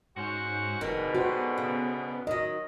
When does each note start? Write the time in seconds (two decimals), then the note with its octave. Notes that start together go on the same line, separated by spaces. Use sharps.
0.16 G#2 C#4 F#4 C5
0.81 F1 G#2 B2 D3 D#3
1.14 B3 F#4 G4 C5
1.58 C#3
2.27 D#3 F#3 D#5